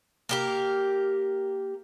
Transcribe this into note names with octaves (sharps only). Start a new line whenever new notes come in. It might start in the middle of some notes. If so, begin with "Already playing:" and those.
A#3 G4 A#4